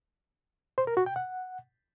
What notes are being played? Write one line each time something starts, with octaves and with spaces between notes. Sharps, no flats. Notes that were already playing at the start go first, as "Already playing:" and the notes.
C5
A#4
F#4
G5
F#5